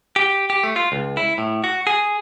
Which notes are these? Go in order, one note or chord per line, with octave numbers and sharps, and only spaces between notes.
G4
G4
A3
F4
C#2
E4
A2
F#4
G#4